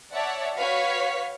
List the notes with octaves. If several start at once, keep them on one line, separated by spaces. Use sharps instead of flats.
C#5 D5 E5 F#5 A5
F#4 B4 C#5 F5 C#6 B6